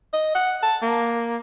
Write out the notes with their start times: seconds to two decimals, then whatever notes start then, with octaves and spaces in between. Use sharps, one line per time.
0.13 D#5
0.35 F#5
0.63 A5
0.82 A#3